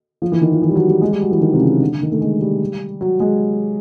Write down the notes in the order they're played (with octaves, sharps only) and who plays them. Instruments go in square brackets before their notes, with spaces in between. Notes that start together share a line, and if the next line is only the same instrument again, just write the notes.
[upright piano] F3
E3
D#3
F3
E3
G3
F#3
G3
G#3
G3
F#3
E3
D#3
C3
C#3
D3
D3
D#3
A3
G#3
G3
F#3
G#3